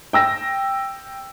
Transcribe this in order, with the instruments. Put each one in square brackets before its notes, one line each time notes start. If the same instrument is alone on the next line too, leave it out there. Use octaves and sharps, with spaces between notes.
[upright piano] G5 E6 A#6